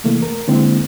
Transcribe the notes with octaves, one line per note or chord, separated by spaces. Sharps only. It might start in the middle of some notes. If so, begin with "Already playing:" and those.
C3 E3 A3 A#3
A#4
D3 G#3 A#3 C4 E4